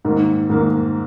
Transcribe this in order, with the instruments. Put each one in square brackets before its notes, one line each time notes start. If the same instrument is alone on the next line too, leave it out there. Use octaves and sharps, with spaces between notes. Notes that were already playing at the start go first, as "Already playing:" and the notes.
[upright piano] G#2 D#3 A#3
G#2 D#3 A#3